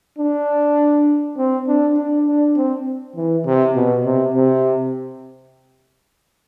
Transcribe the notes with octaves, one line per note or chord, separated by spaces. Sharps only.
D4
C4
D4
D4
D4
C4
E3
C3
B2
C3
C3